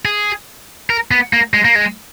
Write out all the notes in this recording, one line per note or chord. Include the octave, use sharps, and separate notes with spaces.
G#4
A#4
B3
A#3
G#3
A#3
G#3